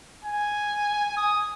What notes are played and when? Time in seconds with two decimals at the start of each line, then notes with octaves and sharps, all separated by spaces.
0.24 G#5
1.17 D#6